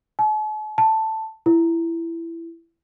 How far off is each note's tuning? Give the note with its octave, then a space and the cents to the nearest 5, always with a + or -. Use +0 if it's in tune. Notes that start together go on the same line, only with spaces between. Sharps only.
A5 -45
A5 +5
E4 +15